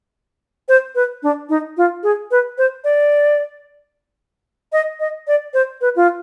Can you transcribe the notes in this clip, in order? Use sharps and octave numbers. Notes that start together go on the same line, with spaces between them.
C5
B4
D4
D#4
F4
G#4
B4
C5
D5
D#5
D#5
D5
C5
B4
F4